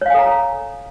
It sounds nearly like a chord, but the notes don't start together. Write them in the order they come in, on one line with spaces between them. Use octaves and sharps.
C#5 F5 G#5 A4 A#5